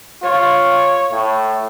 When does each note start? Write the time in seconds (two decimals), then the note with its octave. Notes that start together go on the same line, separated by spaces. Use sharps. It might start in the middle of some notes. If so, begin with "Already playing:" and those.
0.23 F4 C#5
1.12 A2